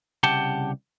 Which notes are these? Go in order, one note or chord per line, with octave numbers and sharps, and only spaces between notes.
C2 C#3 G4 F#5 G5 A5